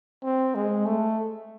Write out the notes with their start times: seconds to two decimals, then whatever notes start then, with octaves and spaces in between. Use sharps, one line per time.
0.24 C4
0.55 G#3
0.86 A3